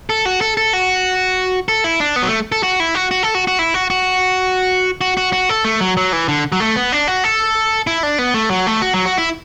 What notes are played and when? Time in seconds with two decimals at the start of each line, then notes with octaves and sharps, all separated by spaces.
0.10 A4
0.25 F#4
0.41 A4
0.57 A4
0.73 F#4
1.68 A4
1.84 E4
2.00 D4
2.16 B3
2.22 F#3
2.28 A3
2.52 A4
2.63 F#4
2.80 E4
2.95 F#4
3.11 F#4
3.23 A4
3.35 F#4
3.47 F#4
3.59 E4
3.74 F#4
3.90 F#4
5.01 F#4
5.17 F#4
5.33 F#4
5.49 A4
5.65 A3
5.81 F#3
5.97 F#3
6.13 E3
6.28 D3
6.52 F#3
6.60 A3
6.76 B3
6.92 D4
7.07 F#4
7.24 A4
7.87 E4
8.03 D4
8.19 B3
8.34 A3
8.50 F#3
8.67 A3
8.82 F#4
8.94 F#3
9.05 F#4
9.18 E4